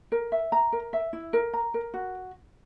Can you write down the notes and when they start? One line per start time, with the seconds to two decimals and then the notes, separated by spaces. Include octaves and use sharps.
0.12 A#4
0.32 E5
0.52 A#5
0.73 A#4
0.93 E5
1.13 E4
1.33 A#4
1.53 A#5
1.74 A#4
1.94 F#4